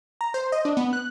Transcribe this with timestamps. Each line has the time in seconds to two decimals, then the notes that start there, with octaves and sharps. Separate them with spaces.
0.21 A#5
0.34 C5
0.52 D#5
0.65 D4
0.77 B3
0.93 F#6